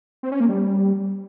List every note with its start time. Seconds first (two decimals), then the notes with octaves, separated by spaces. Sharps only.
0.23 C4
0.32 C#4
0.40 A#3
0.49 G3